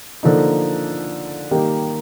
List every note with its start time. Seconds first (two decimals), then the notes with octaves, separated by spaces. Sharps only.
0.23 D3 F3 A#3 D#4
1.51 D#3 G3 A#3 D#4 G4